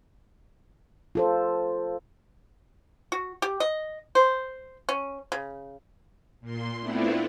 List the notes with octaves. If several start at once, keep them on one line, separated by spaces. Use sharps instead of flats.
F4 A4 C5
F#4
G4
D#5
C5
C#4
C#3
A#2 C6
A3 B3 C4 D4 E4 F4